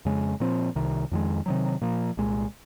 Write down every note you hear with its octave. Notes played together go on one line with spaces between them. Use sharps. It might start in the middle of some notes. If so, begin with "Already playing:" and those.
F2 C#3 G#3
A#2 F3 C4
C2 C3 D#3
F2 D#3 G#3
C3 D#3 F#3
A#2 F3 A#3
C2 A#2 G#3